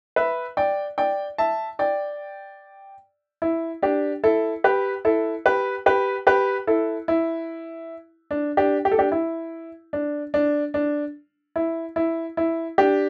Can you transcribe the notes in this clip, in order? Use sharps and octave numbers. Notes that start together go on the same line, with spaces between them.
B4 E5
D5 G5
D5 G5
E5 A5
D5 G5
E4
D4 G4
E4 A4
G4 B4
E4 A4
G4 B4
G4 B4
G4 B4
E4 A4
E4
D4
D4 G4
G4
A4
D4 G4
E4
D4
D4
D4
E4
E4
E4
D4 G4